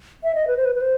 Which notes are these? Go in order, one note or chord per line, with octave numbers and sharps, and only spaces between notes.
E5
D#5
B4
C5
B4
B4
C5